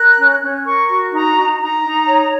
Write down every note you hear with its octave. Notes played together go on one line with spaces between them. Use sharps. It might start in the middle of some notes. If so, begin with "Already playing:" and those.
Already playing: A#4 F#6
C#4
C#4
A#4 C#6
F#4
D#4 A#5
D#4
D#4 A#5
D#4
C#5